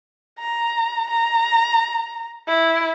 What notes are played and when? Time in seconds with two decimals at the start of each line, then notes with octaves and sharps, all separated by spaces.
0.38 A#5
1.10 A#5
2.48 E4